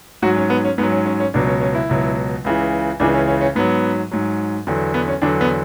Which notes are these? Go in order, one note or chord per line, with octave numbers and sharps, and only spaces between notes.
G#2 F#3 F#4
C#4
B3
C#4
G#2 F#3 B3
C#4
C#4
C#4
C#2 B2 F#3 D4
C#4
C#4
E4
C#2 B2 F#3
C#2 C#3 E3
C#2 C#3 E3 D4
C#4
C#4
C#4
G#2 F#3 B3
G#2 F#3
E2 D3 F#3
B3
C#4
E2 D3 F#3 D4
B3